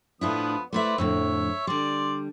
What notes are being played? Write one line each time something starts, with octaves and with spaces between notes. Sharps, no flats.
A2 F3 B3 D4 E4 D#6
A3 E4 B4 C5 D5 E5
F2 A2 D3 C#5 E5
D3 G3 D5 C6